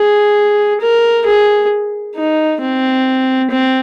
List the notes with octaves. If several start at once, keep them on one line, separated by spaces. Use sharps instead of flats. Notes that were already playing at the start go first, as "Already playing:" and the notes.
Already playing: G#4
A#4
G#4
D#4
C4
C4